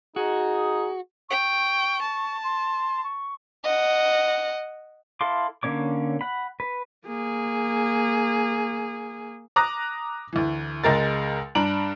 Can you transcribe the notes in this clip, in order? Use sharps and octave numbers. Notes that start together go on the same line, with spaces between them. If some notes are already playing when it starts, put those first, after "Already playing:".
D#4 F#4 G#4
G5 C#6
A5
C6
C#6
D#5 F#5
E4 A4 F5 C6 D6
D3 A#3 C#4 C#5 D6
F#5 B5
B4
A#3 G#4
A#5 D6 D#6 F#6 A#6
D2 E3
C#2 G#3 A#4 A6
G2 D4 A#5 D7 F#7